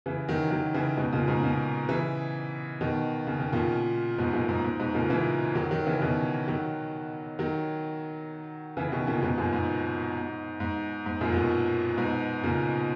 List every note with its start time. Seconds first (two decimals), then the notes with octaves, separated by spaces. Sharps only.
0.06 C#3 E3
0.28 D#3 F#3
0.51 D#3 F#3
0.74 C#3 E3
0.97 G#2 B2
1.13 A#2 C#3
1.28 G#2 B2
1.43 A#2 C#3
1.89 C#3 E3
2.81 B2 D#3
3.27 C#3
3.40 D#3
3.53 A#2 C#3
4.18 G#2 B2
4.33 F#2 A#2
4.49 G#2
4.64 G#2
4.80 G#2 B2
4.95 A#2 C#3
5.10 C#3 E3
5.55 D#3 F#3
5.71 D#3 F#3
5.86 C#3 E3
6.02 B2 D#3
6.48 D#3 F#3
7.39 D#3 F#3
8.77 C#3 E3
8.92 B2 D#3
9.07 A#2 C#3
9.22 G#2 B2
9.37 F#2 A#2
9.53 G#2
10.60 G#2
11.06 G#2
11.21 F#2 A#2
11.32 A#2
11.36 G#2 B2
11.97 G#2 B2
12.44 A#2 C#3